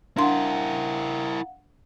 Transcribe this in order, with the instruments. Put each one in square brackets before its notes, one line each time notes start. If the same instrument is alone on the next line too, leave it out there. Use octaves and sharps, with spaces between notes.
[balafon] D4 C6 [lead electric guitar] E4 A#4 [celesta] F5 F#5